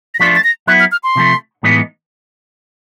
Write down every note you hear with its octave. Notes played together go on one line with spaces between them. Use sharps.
A#6
F3 A3 D4 F4 B6
A6
A#6
F#3 B3 E4 F#6
F6
F6
C6
C3 F3 A3
A2 E3 G#3 B3 D#4